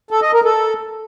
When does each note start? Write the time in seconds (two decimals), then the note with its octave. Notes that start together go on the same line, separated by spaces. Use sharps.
0.11 A4
0.22 D#5
0.33 A#4
0.45 A4